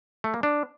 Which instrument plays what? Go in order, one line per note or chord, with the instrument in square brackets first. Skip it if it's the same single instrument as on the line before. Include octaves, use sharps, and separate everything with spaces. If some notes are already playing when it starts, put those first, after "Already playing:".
[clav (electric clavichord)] A3
A#3
D4